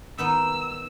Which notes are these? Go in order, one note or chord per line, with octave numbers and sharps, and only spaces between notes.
D#3 B3 D#4 E6